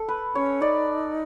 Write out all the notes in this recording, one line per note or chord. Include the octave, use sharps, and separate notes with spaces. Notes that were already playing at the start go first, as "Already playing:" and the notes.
Already playing: A4
B4
C#4 C#5
D#4 D5